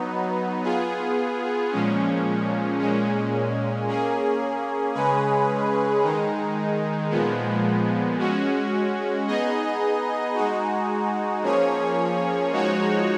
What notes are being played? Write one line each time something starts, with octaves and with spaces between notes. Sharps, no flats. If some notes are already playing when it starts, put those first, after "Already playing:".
Already playing: F#3 B3 D#4
B3 F4 G#4
A#2 F3 G#3 C#4
A#2 G#3 C#4
A#3 C#4 G#4
C#3 G#3 C#4 G#4 B4
D#3 G#3 D#4
A#2 F3 G#3 B3
G#3 C#4 F#4
B3 D#4 G#4 D#5
G#3 D#4 F#4
F3 A#3 C#4 G#4 C#5
F3 G#3 D#4 F#4 C#5